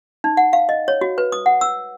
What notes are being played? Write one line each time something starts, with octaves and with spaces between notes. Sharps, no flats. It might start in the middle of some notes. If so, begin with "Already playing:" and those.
D#4
F#5
F5
D#5
C#5
F#4
B4
D#6
F#5
E6